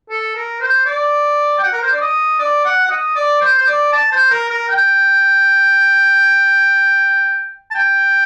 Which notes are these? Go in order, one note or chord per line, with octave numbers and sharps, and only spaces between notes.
A4
A#4
C5
D5
G5
F#5
A#4
C5
D5
D#5
D5
F#5
F#5
D#5
D5
C5
C5
D5
A5
C5
A#4
A#4
G5
A5
G5